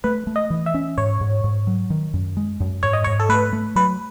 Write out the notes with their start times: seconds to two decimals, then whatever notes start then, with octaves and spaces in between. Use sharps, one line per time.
0.04 A3 B4
0.27 A3
0.36 D#5
0.50 E3
0.66 E5
0.74 C#4
0.97 G#2 C#5
1.21 G#2
1.44 G#2
1.67 F#3
1.90 D#3
2.14 F#2
2.37 G#3
2.60 F#2
2.83 G#2 C#5
2.93 D#5
3.04 G#2 C#5
3.20 A4
3.29 A3 B4
3.53 A3
3.76 F#3 B4